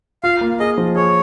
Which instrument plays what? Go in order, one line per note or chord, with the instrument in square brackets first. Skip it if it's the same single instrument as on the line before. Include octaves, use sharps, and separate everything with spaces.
[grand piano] F4 [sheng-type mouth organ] F5
[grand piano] A#3
[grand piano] G#4 [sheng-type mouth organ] D#5
[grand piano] F3
[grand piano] G#4 [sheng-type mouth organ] C#5